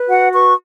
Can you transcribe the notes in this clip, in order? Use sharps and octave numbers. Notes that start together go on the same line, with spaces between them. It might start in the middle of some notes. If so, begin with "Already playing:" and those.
Already playing: B4
F#4 F#5
B4 C#6